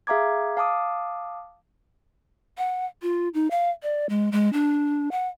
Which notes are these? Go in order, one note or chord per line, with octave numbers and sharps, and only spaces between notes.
G#4 E5 F5 A#5 D6 G#6
F5 A5 D6 D#6
F#5
F4
D#4
F5
D5
G#3
G#3
D4
F#5